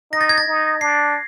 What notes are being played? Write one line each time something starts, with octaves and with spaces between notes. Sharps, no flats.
D#4 A#6
A6
G#6
A6
D#4
D4 C7